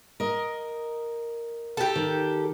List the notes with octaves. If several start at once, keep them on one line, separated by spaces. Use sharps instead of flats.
A#4 D#5
G4 A4
D#3